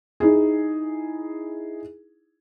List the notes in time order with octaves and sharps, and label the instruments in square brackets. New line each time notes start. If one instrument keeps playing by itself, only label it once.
[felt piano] D#4 E4 G#4